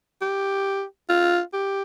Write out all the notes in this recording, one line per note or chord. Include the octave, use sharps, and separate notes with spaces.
G4
F4
G4